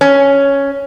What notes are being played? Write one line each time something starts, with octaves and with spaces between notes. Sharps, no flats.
C#4